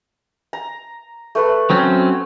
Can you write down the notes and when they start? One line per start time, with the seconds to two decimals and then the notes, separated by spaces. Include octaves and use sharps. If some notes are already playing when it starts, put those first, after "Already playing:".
0.53 A#5
1.35 A3 A4 B4
1.70 F#3 C4 C#4